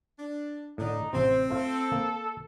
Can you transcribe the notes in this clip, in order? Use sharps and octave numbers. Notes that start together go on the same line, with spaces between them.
D4
A2 D3 D4 D#4
A1 C3 C4 C5
A3 F4 A4 C5
A#3